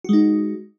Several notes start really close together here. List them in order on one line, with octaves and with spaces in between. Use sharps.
F#4 G#3 D#4